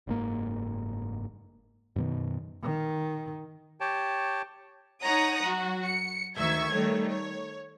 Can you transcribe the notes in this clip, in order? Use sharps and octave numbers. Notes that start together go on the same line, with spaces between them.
F#1 G#2 A#3
F#2 B2 D#3
D#3
G4 C#5 G5 A5
D#4 C#5 F#5 A#5 D#6
F#3 F#4
C#7
D2 D#3 E5 C#6 G#6
D#3 G3 A3 C#5
C#5